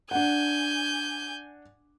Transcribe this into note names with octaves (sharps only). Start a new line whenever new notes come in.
D4 F#5 G#5 G6